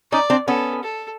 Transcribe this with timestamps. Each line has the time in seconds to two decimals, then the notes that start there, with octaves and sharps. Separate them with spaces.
0.12 C#4 D#4 D5
0.30 C4 D4
0.48 B3 C#4 A4
0.83 A4